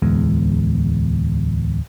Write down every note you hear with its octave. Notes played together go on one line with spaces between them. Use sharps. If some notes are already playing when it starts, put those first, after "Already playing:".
D1 E2 G#3